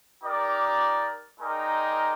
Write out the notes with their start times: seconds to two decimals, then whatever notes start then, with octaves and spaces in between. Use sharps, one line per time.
0.23 D#4 G4 A#4 D5
1.38 G#3 D#4 A#4 D5 G5